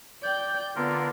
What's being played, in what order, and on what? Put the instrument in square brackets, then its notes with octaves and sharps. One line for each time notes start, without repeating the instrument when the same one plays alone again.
[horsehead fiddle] D5 G5 [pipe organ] G6
[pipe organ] D3 F4 A#4 [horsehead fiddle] B3 D5